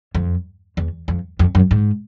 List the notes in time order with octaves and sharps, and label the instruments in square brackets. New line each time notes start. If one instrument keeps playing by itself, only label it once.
[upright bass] F2
E2
F2
F2
F#2
G#2